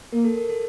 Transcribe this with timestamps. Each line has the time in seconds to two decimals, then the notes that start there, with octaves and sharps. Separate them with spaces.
0.12 A#3 A#4
0.25 A4
0.37 A#4
0.50 A4